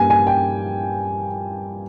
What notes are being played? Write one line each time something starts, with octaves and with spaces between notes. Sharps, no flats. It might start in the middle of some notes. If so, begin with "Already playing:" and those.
Already playing: G2 G3 A#3 G#5
G#5
G5